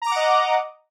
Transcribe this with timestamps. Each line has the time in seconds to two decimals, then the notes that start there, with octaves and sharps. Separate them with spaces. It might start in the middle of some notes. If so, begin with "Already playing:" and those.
0.02 A#5
0.06 D6
0.11 F#5
0.16 D#5